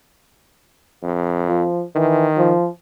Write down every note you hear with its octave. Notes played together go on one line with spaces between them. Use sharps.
F2
F3
D#3 E3
F3